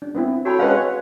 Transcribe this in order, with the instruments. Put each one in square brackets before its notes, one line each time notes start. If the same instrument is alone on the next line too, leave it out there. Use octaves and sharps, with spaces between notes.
[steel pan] D4
B3 C4 E4
[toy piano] F#4 A5 B5 [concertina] A4 C#5 G5
[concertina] G#3 C#4 F#5 [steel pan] G#4 B4 [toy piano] F5 B5
[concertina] C#5